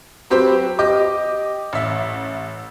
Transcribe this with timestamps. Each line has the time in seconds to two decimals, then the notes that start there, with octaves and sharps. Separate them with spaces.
0.30 F#3 C4 G4 B4 C5
0.79 G4 D#5 D6
1.73 A1 E5